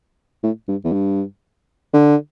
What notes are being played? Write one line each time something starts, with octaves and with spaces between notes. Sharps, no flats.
A2
G2
E2
G2
D3